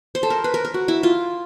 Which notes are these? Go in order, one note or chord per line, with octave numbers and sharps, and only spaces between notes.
C5
A4
A#4
B4
A#4
A#4
F#4
E4
F4